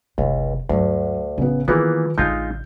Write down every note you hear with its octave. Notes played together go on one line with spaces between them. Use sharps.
F#1 C#2 C3
D2 G2 F#3
A1 C#3 B3
D#3 E3 G3 A#3 B3 F4 G#4 B4
A1 D3 G#3 D#4 F4 G6